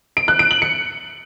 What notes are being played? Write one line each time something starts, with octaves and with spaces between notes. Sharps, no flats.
D7
F#6
D7
F#7
C#7